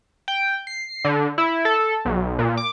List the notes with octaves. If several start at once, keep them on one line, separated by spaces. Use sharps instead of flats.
G5
C7
D3
E4
A4
B1
A#2
D6